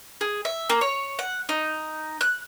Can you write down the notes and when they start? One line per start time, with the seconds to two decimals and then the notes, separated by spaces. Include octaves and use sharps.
0.21 G#4
0.45 E5
0.70 A#3
0.81 C#5
1.19 F#5
1.49 D#4
2.21 F#6